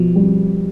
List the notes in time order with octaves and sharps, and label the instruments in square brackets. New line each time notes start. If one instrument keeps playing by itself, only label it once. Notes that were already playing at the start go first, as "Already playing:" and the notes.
Already playing: [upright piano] B2 [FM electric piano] F3
[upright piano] G3